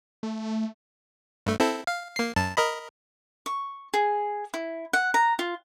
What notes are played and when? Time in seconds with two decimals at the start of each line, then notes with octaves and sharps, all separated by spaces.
0.23 A3
1.46 G2 A3
1.60 C4 E4 A4
1.87 F5
2.16 A#3 C7
2.36 F#2 A5
2.57 A#4 D#5 B5
3.46 C#6
3.94 G#4
4.54 E4
4.93 F#5
5.14 A#5
5.39 F4